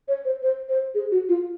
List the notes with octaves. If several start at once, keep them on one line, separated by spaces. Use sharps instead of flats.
C#5
C5
C5
C5
G#4
F#4
F4